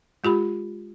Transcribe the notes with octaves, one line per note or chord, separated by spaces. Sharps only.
G#3 F4 G4 B5